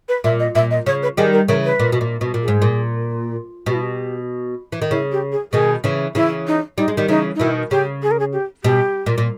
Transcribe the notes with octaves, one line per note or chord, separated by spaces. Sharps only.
B4
A#2 E5
D#5
A#2 E5
D#5
C#3 C#5
B4
D#3 G3 G#4
A#4
C#3 E3 A#4
B4
A#2
B2
A#2
B2
A#2
G#4
G#2
A#2
B2 G4
E4
G4
E3
D#3
C#3 E4
G4
G#4
B2 D#3 G#4
C#3 E3
C#3 E3 E4
D#4
G3 D#4
G#3
D#3 G3
C#3 E3 D#4
D#4
B2 D#3 E4
C#3 G4
G#4
A#4
G#4
G4
B2 G4
A#2
A#2